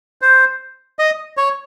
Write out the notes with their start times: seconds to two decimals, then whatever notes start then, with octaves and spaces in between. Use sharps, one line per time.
0.22 C5
0.99 D#5
1.37 C#5